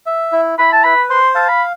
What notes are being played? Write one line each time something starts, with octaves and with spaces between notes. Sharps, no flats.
E5
E4
E4 B5
A5
B4 B5
C5 C6
F5 A5
B5